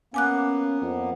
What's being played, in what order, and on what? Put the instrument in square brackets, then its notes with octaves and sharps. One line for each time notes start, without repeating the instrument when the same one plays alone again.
[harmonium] A#3 B3 [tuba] C#4 [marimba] G#5 D6 F#6
[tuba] F2